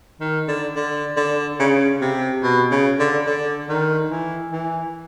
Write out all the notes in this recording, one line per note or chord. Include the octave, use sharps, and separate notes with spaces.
D#3
D3
D3
D3
C#3
C3
B2
C#3
D3
D3
D#3
E3
E3